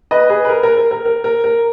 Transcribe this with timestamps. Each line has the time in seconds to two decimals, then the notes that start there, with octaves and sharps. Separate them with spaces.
0.11 B4 D#5
0.30 G#4 B4
0.45 B4
0.49 A#4
0.63 A#4
0.77 A#4
0.91 A#4
1.05 A#4
1.24 A#4
1.44 A#4